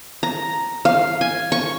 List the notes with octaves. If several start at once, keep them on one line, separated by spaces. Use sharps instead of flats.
A#5
F5
G#5
C#6